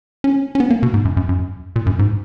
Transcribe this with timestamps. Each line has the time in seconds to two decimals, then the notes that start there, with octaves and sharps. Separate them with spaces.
0.24 C#4
0.55 C#4
0.60 B3
0.70 A#3
0.83 B2
0.94 G#2
1.05 F#2
1.17 F#2
1.29 F#2
1.76 A#2
1.86 F#2
1.99 G#2